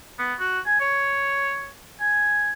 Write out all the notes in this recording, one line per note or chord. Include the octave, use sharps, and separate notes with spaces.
B3
F#4
G#5
C#5
G#5